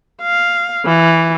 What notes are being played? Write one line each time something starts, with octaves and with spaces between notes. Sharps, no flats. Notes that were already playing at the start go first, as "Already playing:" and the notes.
F5
E3